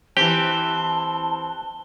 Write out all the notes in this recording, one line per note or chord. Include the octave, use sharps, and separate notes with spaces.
E3 C4 G4 A5 G7